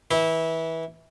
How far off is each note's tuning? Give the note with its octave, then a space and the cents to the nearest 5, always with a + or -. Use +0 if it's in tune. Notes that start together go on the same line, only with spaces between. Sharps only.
E3 -20 E4 -20